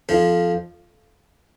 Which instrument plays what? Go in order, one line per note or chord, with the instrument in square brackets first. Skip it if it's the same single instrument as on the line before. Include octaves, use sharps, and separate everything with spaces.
[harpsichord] F2 F3